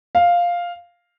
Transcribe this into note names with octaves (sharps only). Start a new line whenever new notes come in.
F5